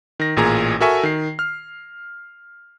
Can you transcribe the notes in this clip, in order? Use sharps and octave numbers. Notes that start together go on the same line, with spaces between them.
D#3 A#6
A1 A#2 G#4 A#5 G#6
F#4 A4 A#4 E5 G#5 C#6
D#3 C7
F6